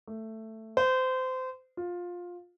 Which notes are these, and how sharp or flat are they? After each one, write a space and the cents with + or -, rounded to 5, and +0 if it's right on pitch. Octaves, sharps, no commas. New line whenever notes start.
A3 +10
C5 -25
F4 +15